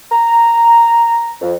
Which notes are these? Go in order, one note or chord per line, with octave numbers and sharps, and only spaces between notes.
A#5
F2